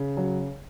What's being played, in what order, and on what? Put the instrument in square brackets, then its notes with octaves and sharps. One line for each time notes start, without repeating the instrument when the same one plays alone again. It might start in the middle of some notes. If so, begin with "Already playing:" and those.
Already playing: [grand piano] C#3
F#3